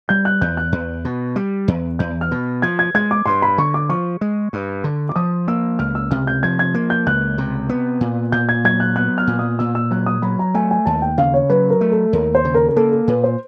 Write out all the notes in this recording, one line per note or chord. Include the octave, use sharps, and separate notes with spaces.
G3 G6
F#6
E2 G6
F#6
E2
B2
G3
E2
E2 G6
F6
B2
F3 G#6
G#6
G#3 G#6
D6
G2 C6
B5
D3 C#6
D6
F3 C#6
G#3
G2
D3
D6
F3 D#6
A#3 E6
C#2 F6
E6
C3 F6
G6
F3 G#6
G#6
A#3
G6
C#2 F#6
C3
B3
A#2
A#2 G6
G#6
F#3 G#6
F#6
B3 F#6
F6
A#2
D#6
A#2 E6
E6
F#3 F#6
D#6
F#3 B5
A#5
A3 G#5
G#5
D#2 A5
G5
C#3 F5
C#5
F#3 B4
A#4
A3
A4
D#2 A#4
C5
C#3
A#4
A#4
A#3 A4
A4
A#2 B4
C5